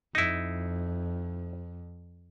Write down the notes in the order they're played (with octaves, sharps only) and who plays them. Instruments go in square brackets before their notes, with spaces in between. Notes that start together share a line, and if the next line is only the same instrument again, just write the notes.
[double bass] F2 [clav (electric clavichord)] D#4 E4